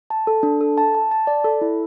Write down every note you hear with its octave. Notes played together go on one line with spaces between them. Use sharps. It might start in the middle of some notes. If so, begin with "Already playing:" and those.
A5
A4
D4
A4
A5
A5
A5
D5
A4
E4